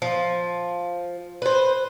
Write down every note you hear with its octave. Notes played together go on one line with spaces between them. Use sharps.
F3
B4 C5